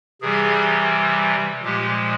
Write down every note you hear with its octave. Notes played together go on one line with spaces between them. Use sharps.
C3 E3 G3 G#4
A#2 F3 G#3 G4